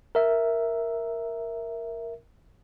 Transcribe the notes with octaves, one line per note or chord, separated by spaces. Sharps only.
A#4 E5